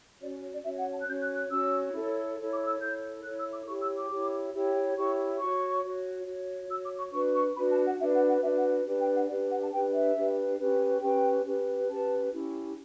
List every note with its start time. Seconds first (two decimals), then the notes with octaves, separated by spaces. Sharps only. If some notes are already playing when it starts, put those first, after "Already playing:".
0.21 C#4 F#4 C#5 D5
0.31 C#5
0.42 C#5
0.53 D5
0.63 C#4 F#4 C#5 E5
0.78 F#5
0.93 A5
1.01 F#6
1.07 C#4 F#4 C#5 G6
1.21 F#6
1.36 F#6
1.50 C#4 F#4 C#5 E6
1.94 E4 A4 C#5
2.38 E4 A4 C#5
2.52 D6
2.65 E6
2.80 E4 A4 C#5 G6
3.23 E4 A4 C#5 F#6
3.39 E6
3.52 D6
3.66 E4 G4 C#5 C#6
3.81 E6
3.96 D6
4.10 E4 G4 C#5
4.54 E4 G4 C#5
4.96 E4 G4 C#5 C#6
5.40 F#4 C#5 C#6
5.84 F#4 C#5
6.26 F#4 C#5
6.69 F#4 E6
6.73 C#5
6.84 D6
6.98 C#6
7.13 D4 F#4 B4 C#6
7.35 C#6
7.56 D4 F#4 B4 B5
7.70 A5
7.85 F#5
8.00 D4 F#4 B4 E5
8.14 F#5
8.29 F#5
8.42 D4 F#4 B4 E5
8.57 F#5
8.86 D4 G4 B4
9.00 G5
9.15 F#5
9.29 D4 G4 B4 D5
9.50 F#5
9.62 A5
9.72 D4 G4 B4 G5
9.94 E5
10.16 D4 G4 B4
10.58 C#4 G4 B4
11.02 C#4 G4 B4 G5
11.46 C#4 G4 B4
11.89 C#4 G4 B4 A5
12.32 C#4 E4 G4